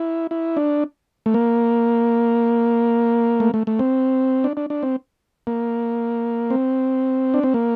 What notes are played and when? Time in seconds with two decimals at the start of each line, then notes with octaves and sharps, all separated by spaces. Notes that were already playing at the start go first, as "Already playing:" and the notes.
Already playing: E4
0.31 E4
0.57 D4
1.26 A3
1.34 A#3
3.40 A3
3.54 A3
3.67 A3
3.79 C4
4.44 D4
4.57 D4
4.70 D4
4.83 C4
5.47 A#3
6.50 C4
7.34 D4
7.43 C4
7.54 A#3